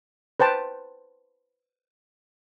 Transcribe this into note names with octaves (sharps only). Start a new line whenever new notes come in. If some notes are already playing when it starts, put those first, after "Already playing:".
B4 C5 G5 A5